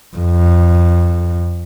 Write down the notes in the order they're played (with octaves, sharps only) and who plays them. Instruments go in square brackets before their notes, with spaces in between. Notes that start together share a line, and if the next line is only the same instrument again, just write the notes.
[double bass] F2